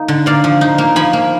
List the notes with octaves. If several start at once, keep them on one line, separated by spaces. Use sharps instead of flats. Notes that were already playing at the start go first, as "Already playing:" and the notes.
Already playing: A#3 D#4
D3
A#3 D5 F5
F3
D#4
A#3
F3 G#5 B5
A#3